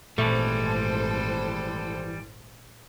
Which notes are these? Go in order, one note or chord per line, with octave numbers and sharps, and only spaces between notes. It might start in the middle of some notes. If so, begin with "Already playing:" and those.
G#1 A#2 E3 G3 A3 A4 C5